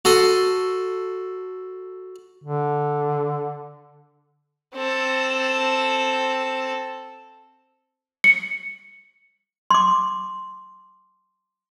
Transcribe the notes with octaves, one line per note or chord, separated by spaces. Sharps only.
F#4 A4 C6 D#6
D3
C4 A4
C#7
C6 D6